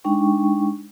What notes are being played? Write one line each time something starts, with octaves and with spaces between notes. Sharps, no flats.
G#3 D4 D#4 G5 C#6